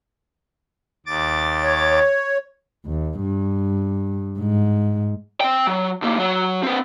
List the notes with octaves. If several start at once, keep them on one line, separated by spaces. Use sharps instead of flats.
D#2 D6 A6
C#5
D#2
G2
G#2
C4 G5
F#3
D2 A#3
F#3 F#4
C4 B4